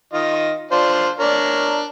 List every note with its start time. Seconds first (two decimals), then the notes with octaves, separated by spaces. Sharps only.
0.13 D#3 F4 D#5
0.71 D4 F4 C5
1.19 D4 A#4 C#5